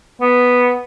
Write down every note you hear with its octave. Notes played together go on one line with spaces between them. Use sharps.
B3